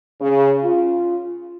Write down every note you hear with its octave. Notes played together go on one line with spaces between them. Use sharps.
C#3
F4